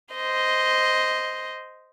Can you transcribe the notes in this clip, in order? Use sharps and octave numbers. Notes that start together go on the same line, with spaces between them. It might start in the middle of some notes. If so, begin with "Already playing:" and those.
C5 D#5